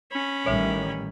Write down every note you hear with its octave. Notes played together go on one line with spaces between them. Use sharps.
C#4 B5
A1 D#3 G3 C#5 E5